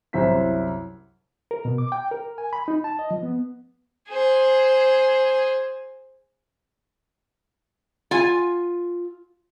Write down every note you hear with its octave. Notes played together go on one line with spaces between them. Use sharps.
C2 F#2 E4 C5 B6
A#4
B2
D6
G5
A#4
G#5
B5
D#4
A5
D#5
F3
B3
G#4 C5
F4 G#5